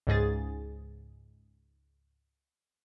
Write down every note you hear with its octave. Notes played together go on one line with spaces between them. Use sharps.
C#2 G#2 G#4 A6